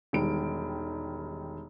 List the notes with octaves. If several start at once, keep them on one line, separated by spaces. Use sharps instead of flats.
E1 D#3 G3 D7